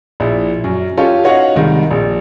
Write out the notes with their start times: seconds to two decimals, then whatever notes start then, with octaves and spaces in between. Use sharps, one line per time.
0.20 A#1 E4
0.64 F#2
0.97 C#4 F4 G4 A4 C#5
1.24 D#4 F#4 C#5 D#5 F5 F#5
1.55 C2 D#3 G3 G#3
1.91 A#1